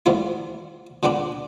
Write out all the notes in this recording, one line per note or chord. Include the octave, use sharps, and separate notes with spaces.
E2 G#2 D#3 F3 A3 E4
A#2 D3 G#3 B3 D4